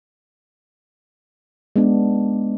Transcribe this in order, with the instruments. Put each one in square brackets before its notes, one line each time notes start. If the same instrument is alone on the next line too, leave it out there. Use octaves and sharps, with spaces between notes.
[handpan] G#3 B3 D4